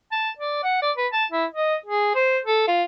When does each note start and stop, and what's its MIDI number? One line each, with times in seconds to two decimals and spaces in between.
0.12 0.30 81
0.39 0.61 74
0.64 0.82 78
0.82 0.91 74
0.97 1.07 71
1.13 1.25 81
1.32 1.45 64
1.52 1.75 75
1.86 2.11 68
2.15 2.38 72
2.44 2.67 69
2.68 2.83 65